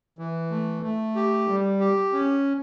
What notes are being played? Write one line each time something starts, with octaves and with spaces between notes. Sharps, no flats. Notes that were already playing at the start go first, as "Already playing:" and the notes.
E3
A3
A3
G4
G3
G4
C#4